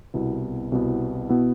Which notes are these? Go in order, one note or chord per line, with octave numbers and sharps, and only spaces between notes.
C2 B2 B3 E4
C2 B2 B3 E4
B2 B3 E4